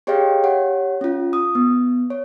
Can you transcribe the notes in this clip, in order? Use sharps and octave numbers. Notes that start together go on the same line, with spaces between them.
G4 G#4 C#5 D#5 F5 G5
G4 C#5 F#5
C#4 F4
D#6
B3
C#5